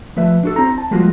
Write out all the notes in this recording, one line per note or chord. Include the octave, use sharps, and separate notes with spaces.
F3 A3 B4 E5
D4 F#4 A4
C4 E4 A#5
A5
F3 G3 G#3 A#3 F4 F#4